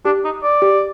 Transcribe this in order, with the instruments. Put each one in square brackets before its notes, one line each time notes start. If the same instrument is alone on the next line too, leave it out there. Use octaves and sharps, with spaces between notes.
[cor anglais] D4 [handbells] G4
[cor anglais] D#4
D5
[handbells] G4